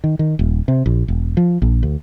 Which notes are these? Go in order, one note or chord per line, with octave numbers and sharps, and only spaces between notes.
D#3
D#3
D#1
C3
A#1
E1
F3
A#1
D2